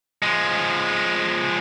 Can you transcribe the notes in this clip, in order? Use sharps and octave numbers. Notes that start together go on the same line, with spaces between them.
F3 G#3